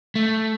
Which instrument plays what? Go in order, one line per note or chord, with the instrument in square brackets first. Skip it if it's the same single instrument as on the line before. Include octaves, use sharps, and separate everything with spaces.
[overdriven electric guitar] A3